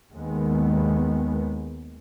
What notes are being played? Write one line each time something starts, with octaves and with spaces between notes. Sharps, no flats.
D#2 D#3 G#3 B3